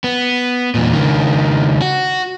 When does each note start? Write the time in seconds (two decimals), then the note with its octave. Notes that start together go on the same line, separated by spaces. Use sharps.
0.04 B3
0.75 E2 A#2
0.93 C#2 D#3
1.82 F#4